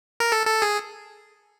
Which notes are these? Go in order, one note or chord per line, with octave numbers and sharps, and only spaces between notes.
A#4
A4
A4
G#4